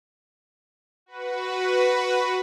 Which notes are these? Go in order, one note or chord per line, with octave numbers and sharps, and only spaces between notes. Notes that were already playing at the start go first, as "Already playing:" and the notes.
F#4 B4